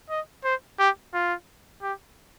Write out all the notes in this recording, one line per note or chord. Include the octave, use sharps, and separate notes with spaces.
D#5
C5
G4
F4
G4